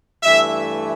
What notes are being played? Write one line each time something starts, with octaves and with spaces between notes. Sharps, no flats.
G2 E3 A3 E5